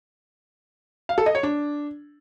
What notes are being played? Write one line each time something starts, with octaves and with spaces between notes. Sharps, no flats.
F5
A4
D#5
C#5
D4